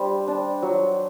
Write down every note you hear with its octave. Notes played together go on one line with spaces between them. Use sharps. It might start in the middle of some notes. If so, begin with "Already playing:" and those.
Already playing: G3 D4 C5
D4
F#3